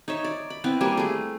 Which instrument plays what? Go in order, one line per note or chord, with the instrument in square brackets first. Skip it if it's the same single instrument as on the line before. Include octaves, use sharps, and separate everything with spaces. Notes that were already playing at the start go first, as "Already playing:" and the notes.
[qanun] D#4 C#5 E5
D5
B5
B3 C4 E4
G3 A#3 C5 G#5
A3 G#4